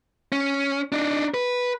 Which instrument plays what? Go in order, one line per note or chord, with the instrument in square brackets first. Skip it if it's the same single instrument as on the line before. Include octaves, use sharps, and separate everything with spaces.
[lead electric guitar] C#4
D4 D#4
B4